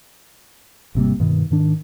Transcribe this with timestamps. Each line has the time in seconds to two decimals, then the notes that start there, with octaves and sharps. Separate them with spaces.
0.95 G#1 C3 G3 A#3
1.20 G2 B2 D#3
1.51 G#2 D#3 D4